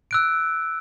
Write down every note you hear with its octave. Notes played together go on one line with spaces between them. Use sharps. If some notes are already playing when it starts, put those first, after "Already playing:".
E6 F#6 D7